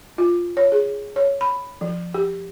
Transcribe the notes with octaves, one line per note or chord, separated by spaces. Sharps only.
F4
C#5
G#4
C#5
B5
F3
G4